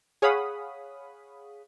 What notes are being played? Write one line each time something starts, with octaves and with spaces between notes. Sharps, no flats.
G#4 C#5 F5 F#5 B5 D#6